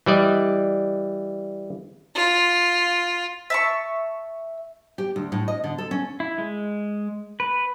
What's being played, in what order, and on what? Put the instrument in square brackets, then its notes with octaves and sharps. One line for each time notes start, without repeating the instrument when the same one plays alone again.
[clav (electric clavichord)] E3 G3 D5 D#5
[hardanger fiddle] F4
[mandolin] E5 A5 C#6
[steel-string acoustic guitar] G4
D2
A2
D#5
D3
A4
C#4
[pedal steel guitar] E4
G#3
B4